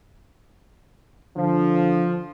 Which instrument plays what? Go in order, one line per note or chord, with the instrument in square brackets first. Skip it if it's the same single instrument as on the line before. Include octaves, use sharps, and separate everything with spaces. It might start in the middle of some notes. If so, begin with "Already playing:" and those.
[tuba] D3 [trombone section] F3